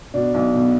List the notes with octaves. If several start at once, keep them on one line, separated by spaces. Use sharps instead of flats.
B2 D4
B1
B2